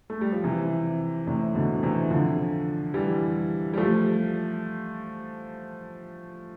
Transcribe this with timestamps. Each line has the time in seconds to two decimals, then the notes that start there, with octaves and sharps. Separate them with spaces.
0.10 A3
0.21 G3
0.32 F3
0.44 C3 E3
1.27 A2 C3
1.55 B2 D3
1.83 C3 E3
2.10 D3 F3
2.94 E3 G3
3.74 G3
3.77 F3 A3